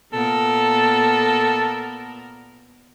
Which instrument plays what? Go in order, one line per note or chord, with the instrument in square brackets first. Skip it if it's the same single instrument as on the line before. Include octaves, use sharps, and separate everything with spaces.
[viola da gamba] A#2 B3 A#4 [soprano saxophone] A4